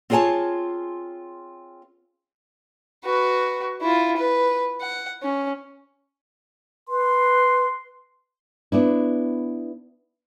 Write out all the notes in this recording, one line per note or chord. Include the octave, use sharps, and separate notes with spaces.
C4 F4 G#4 C#5 G#5 A5
F#4 B4
E4 F4
B4
F#5
C#4
B4 C6
B3 D4 E4